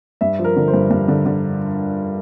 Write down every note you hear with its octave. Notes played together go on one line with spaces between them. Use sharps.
G2 E5
F3
A#4
D3
C5
G2
G2
D3
D3